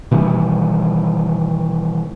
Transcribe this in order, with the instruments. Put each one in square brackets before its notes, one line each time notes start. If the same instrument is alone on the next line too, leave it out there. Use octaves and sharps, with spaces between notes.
[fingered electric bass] B2 D#3 E3 G3